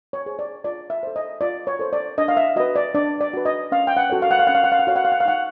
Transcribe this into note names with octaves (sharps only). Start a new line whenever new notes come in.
C#5
G#4 C5
D5
F4 D5
E5
A4 C5
D#5
F4 D5
C#5
A4 C5
D5
D4 D#5
F5
E5
F#4 B4 D#5
D5
D4 D5
D5
F#4 B4
D#5
C#4 F5
G5
F#5
F#4 A4 C#5
F5
F#5
F5
C#4 F#5
F5
F#5
F5
F#5
F#4 A4 C#5 F5
F#5
F5
F#5
F5
D#4 F#5